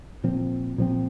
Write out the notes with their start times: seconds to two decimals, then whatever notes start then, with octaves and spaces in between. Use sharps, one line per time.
0.24 A#2 F3 C4
0.78 A#2 F3 C4